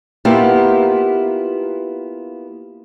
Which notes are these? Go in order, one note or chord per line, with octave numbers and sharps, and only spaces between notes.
A#3 B3 E4 F4 G4